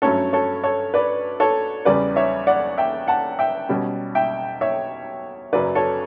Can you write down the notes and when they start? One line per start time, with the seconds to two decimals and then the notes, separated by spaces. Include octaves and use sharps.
0.02 G2 F#3 A3 C#4 A4 C#5
0.33 A4 C#5
0.63 A4 C#5
0.94 B4 D5
1.40 A4 C#5
1.85 E2 C#3 G3 B4 D5
2.16 C#5 E5
2.47 D5 F#5
2.78 E5 G5
3.08 F#5 A5
3.39 E5 G5
3.69 B2 G3 C#4
4.15 E5 G5
4.61 C#5 E5
5.53 F#2 C#3 F#3 B4 D5
5.75 A4 C#5